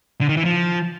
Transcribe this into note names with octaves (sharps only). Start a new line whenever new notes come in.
D3
D#3
E3
F3